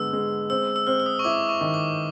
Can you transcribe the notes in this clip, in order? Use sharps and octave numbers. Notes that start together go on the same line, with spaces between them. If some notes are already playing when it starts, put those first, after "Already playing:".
Already playing: D3 G#3 B3 E6
G#3
C4 E6
E6
C4 F6
E6
D#6
C#6
E4 D6
C#6
D#3
D6